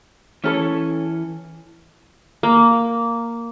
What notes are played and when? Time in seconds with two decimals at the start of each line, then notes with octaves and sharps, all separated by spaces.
0.44 E3 C#4 A4 C#5
2.43 A#3